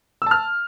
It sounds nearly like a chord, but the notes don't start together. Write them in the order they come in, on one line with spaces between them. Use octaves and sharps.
E6 A5 F6